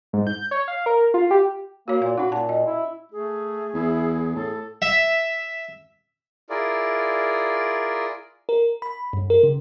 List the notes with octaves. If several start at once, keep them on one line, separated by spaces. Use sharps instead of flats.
G#2
G6
C#5
F5
A#4
F4
G4
A#3 F#4 C#5
A#2 F5
C#4 D#4 F#4
A#2 A5
D#5
E4
A3 G#4
E2 E4
A2 A4
E5
E4 F4 G#4 A#4 D5
A#4
B5
G2
A#4
C#3